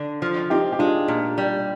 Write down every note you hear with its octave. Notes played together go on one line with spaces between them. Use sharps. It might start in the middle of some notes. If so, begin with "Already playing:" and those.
Already playing: D3
F3
C4 D#4 G4
G4
G#3 D4 F4
A#2
G3